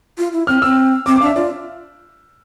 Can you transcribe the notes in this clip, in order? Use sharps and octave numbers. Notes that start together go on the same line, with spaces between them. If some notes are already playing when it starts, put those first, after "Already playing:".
F4
E4
C4 F6
C4 E6
C4 D6
D6
D4 E5 F5
F4 D5